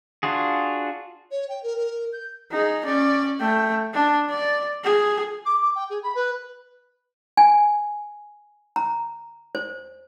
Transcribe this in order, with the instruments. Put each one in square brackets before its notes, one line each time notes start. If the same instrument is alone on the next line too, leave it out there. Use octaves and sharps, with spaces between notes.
[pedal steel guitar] D4 F4 F#4 G#4
[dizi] C#5
G5
A#4
A#4
G6
[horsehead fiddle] D#4 G#4
C#4 D5
A3 G5
D4
D5
G#4
[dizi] D6
D6
G5
G#4
B5
B4
[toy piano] G#5
A#5
C5